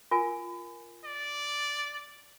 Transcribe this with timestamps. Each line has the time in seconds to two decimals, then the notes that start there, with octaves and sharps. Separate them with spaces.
0.11 F4 A#4 G#5
1.04 D5